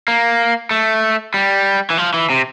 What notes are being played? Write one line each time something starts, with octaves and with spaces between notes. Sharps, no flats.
A#3
A3
G3
E3
F3
E3
C3